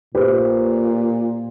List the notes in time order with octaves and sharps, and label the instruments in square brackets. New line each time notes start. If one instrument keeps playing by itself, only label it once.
[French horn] A#2 [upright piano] G4 B4 C5